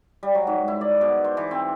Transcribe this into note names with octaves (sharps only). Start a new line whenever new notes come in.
G3
F#3
G#2
E4
D5
B2
C5
E3
C4